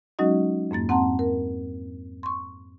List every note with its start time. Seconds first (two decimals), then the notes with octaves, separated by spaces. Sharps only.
0.19 F#3 G#3 C#4 D#4 F#4 D#5
0.71 F2 G#2 A#3 A6
0.89 C4 F#5 A5 A#5 C6
1.19 A#4
2.23 C6 C#6